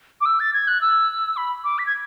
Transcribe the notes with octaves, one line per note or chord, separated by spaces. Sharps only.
D6
E6
A6
G#6
F#6
E6
B5
D6
B6
G#6